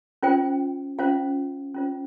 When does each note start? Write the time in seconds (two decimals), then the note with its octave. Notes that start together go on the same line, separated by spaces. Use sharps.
0.23 C#4 F4 C5 G5
0.99 C#4 F4 C5 F5
1.74 C#4 F4 C5